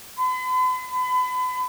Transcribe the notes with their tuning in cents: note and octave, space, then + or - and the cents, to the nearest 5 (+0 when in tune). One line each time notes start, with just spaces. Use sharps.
B5 +45
B5 +35